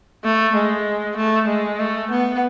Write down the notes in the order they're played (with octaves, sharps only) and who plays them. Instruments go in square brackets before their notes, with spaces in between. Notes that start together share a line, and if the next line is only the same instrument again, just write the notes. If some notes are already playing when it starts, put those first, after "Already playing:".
[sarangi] A3
G#3
A3
G#3
A3
B3